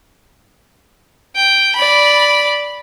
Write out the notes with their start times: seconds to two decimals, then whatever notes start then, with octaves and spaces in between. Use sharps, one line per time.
1.36 G5
1.76 D5 B5